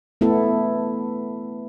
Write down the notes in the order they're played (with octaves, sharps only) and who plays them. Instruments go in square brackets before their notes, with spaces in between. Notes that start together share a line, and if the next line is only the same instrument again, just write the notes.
[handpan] A3 B3 E4 A4